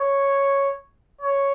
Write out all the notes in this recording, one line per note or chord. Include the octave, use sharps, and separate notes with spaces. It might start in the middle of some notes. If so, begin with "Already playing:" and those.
Already playing: C#5
C#5